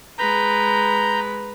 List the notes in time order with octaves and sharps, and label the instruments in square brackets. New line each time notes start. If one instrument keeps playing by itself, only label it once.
[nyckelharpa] G#3 B4 [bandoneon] A#5 G6